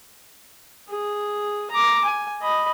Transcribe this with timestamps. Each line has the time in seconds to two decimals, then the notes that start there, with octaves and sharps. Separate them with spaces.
0.89 G#4
1.71 A#5 D6
2.05 G#5
2.42 D#5 B5